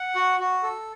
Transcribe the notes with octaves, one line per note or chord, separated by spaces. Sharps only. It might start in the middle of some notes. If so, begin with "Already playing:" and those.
Already playing: F#5
F#4
F#4
A4